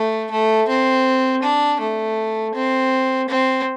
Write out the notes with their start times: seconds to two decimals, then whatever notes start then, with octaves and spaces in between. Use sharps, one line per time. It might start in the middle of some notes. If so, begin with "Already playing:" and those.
Already playing: A3
0.31 A3
0.68 C4
1.43 D4
1.80 A3
2.54 C4
3.29 C4